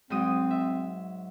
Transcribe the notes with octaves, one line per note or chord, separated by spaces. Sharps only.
G#2 F#3 C4 D#6
E5